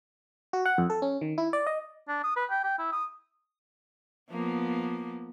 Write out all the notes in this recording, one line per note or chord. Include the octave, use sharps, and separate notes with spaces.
F#4
F#5
F2
A4
C#4
D#3
E4
D5
D#5
D4
D#6
B4
G5
G5
E4
D#6
F3 A#3 B3